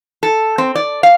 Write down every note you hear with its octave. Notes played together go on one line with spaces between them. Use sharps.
A4
C4
D5
F5